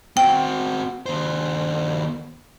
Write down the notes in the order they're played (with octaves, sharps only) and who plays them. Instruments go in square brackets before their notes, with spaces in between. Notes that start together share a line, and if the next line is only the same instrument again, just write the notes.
[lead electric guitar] C4 F#4 [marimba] G5
[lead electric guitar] D#2 C5